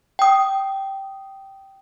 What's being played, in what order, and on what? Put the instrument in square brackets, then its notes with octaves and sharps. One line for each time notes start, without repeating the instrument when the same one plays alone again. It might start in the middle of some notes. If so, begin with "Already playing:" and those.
[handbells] G5 D#6